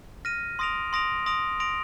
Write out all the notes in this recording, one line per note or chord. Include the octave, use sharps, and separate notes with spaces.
F6 A#6 D#7
C6 D#6 A#6 D7 F7
C6 D#6 A#6 D7 F7
C6 D#6 A#6 D7 F7
C6 D#6 A#6 D7 F7